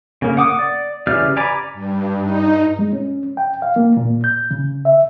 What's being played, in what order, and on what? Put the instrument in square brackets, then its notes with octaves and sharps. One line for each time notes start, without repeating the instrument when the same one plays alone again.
[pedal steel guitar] C#3 A#3
F#5 D6 D#6
D5
C#3 E3 G4 D5 F6
D5 G#5 A#5 B5 D6
[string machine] G2
D#4
[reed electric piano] G#3
C#4
G5
F5
A#3
A#2
G6
C#3
E5